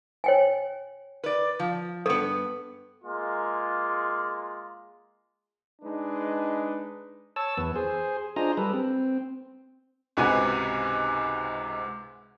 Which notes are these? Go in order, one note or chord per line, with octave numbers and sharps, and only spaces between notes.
C#5 G5 G#5
B4 D5
F3
G2 B3 A4
G#3 A#3 F4
G#3 D4 D#4 B4
C#5 A5 E6
E2 B3
G#4 C5
D4 F4 G#4 C5 D#5 A#5
G3 A4 B4
C4
C#2 G#2 C3 F#4 B4 G#5